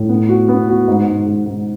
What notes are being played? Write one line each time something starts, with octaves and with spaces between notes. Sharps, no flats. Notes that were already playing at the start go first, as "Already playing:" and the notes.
Already playing: A2
B3
F#4
B3
F#4
G#2
G#2
G#2
G#2